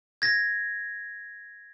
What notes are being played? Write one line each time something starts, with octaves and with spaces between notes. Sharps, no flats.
G#6 A#6